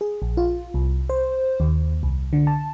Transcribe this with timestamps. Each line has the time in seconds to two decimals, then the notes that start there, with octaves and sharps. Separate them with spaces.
0.01 G#4
0.22 A#1
0.37 F4
0.74 C2
1.09 C5
1.60 D#2
2.03 C2
2.33 D3
2.47 A5